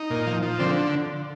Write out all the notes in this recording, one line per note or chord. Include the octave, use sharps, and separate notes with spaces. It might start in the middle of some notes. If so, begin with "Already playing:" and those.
Already playing: D#4
A#2
F3
F3
D3 C4